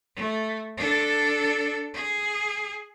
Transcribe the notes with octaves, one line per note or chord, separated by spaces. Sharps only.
A3
D4 A4
G#4